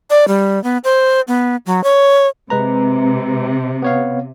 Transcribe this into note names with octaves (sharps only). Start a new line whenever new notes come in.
D5
G3
B3
C5
B3
F#3
C#5
C3 G#3 B4 A#5
B3 C#5 F5